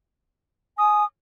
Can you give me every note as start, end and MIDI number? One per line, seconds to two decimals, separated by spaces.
0.78 1.04 80
0.78 1.05 87